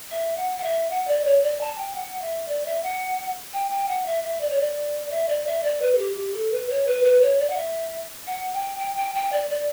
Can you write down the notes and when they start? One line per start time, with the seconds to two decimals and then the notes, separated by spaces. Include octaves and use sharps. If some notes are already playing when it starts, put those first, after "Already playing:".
0.10 E5
0.37 F#5
0.57 F#5
0.63 E5
0.90 F#5
1.07 D5
1.24 C#5
1.42 D5
1.60 A5
1.77 G5
1.95 F#5
2.21 E5
2.47 D5
2.65 E5
2.83 F#5
3.53 G5
3.70 G5
3.88 F#5
4.05 E5
4.23 E5
4.40 D5
4.50 C#5
4.59 D5
5.11 E5
5.28 D5
5.46 E5
5.63 D5
5.81 B4
5.94 A4
5.98 G4
6.16 G4
6.33 A4
6.51 B4
6.69 C#5
6.86 B4
7.04 B4
7.21 C#5
7.39 D5
7.49 F#5
7.56 E5
8.26 F#5
8.53 G5
8.79 G5
8.96 G5
9.14 G5
9.32 D5
9.49 D5